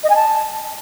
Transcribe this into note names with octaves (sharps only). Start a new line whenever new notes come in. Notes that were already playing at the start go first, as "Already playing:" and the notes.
D#5
G#5
A5